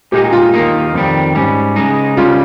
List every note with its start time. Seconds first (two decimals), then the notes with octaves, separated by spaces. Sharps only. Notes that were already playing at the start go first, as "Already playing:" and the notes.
0.12 A#2 G#3 D#4 G4
0.33 F4
0.54 D#2 D#3 A#3 D#4
0.94 F2 D#3 G3
1.35 G#2 G3 C#4
1.76 C#3 G#3 D#4
2.17 C#2 C#3 G3 C#4 F4